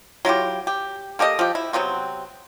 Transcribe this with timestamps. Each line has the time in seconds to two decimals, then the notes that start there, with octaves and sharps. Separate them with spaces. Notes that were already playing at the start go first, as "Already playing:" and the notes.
0.25 F#3 E4 F4 G4
0.67 G4
1.19 A#3 G4 A4 D#5
1.39 F3 G4
1.55 E4
1.73 C3 F#3 B3 C4